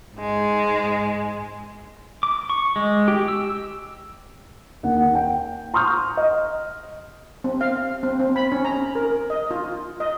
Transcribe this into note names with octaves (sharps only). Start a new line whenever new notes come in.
G#2 G#3
D6
C#6
G#3
G4
E6
D#2 F#5
G5
A#5 C6 C#6 D#6 F6 G6
D#5
C4
F5
C4
C4
B5
C#4
A#5
A#4
D#5
F4
D#5